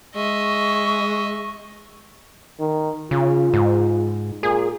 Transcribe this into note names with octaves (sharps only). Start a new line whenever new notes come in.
G#3 D#5 E5 C#6
D#3
C#3 F4
G#2
A#2 G#4